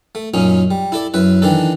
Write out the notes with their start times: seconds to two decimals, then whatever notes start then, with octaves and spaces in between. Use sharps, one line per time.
0.15 A3
0.34 F#2 A#2 C#4 D#4
0.71 G3
0.92 E4 A4 D5
1.14 F#2 E4 B4
1.42 D#3 E3 D4 A4